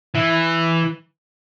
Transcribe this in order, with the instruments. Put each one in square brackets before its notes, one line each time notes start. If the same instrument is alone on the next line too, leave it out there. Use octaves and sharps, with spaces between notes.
[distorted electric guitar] E3